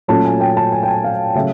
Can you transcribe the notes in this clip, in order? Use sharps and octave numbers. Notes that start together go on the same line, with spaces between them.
A#2 F#3 A3 C#4 A5
G#5
G5
A5
G#5
G5
G#5
F5
C#3 F#3 A3 C#4 E5